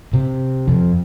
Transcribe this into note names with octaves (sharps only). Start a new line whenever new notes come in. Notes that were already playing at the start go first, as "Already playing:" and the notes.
C3
F2